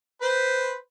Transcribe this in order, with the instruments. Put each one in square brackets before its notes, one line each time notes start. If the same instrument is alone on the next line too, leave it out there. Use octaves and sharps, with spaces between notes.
[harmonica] B4 C5